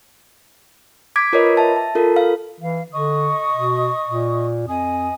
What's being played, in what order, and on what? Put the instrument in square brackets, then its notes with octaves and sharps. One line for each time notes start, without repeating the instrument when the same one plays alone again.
[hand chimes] D6 G#6 B6 D7
F4 A#4 B4 C#5 D#5
E5 A5
A5
F4 A4 A#4
F5
[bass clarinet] E3 [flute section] F5
[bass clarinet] D3 [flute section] D#5 C#6 D#6
[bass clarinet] B2
A#2
[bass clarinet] F2 [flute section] D#5 G#5 D#6